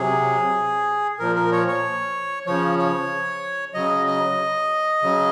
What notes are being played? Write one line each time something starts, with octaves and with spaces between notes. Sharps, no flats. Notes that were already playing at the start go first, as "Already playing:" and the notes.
Already playing: C3 F#3 G#4
A#2 F3 A#4
A#4
C#5
C#5
C#3 F3 C#5
C#5
C#3 F#3 D#5
D#5
C#3 F#3